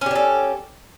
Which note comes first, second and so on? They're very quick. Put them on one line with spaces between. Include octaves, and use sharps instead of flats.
C#4 G4 D4 A4